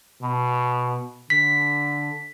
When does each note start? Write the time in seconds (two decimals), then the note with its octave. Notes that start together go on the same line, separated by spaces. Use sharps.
0.22 B2
1.30 D3 B6